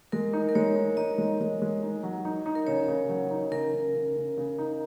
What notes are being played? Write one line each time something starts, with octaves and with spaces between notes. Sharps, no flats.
G#3 A#4
D#4
A#4
G#3 C#5
D#4
D#4 D#5
G#3
G#3
G#3
D#4
F#3
D#4
D#4
A#4
C#3 C#5
C#3
F#3
D#4
C#3 A#4
C#3
C#3
C#3
C#3
D#4